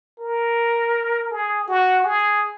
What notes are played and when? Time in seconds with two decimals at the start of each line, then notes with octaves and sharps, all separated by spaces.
0.20 A#4
1.31 G#4
1.68 F#4
2.04 G#4